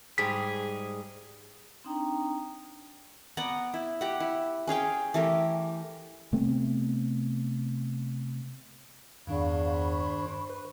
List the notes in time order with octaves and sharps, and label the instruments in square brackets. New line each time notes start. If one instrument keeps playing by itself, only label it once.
[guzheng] G#2 G3 [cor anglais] G#4 [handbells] B6
[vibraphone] C4 D4 D#4 G5 A#5
[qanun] B3 D5 F#5 A#5
E4
G4 F#5
E4
C#4 G#4 F5 G5
E3 A3 G4 A#4
[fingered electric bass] C3 A3 B3 C4
[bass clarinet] E2 [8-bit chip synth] G2 D#3 D4 [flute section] F5 B5 C#6
[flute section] C5 B5 C#6
[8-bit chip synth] B4